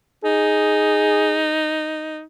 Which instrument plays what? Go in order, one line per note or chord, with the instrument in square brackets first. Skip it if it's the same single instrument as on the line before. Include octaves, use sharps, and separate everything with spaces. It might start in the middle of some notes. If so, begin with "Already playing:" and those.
[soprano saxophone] D#4 [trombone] G#4